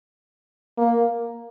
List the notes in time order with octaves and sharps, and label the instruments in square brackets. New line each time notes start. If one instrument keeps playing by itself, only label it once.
[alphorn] A#3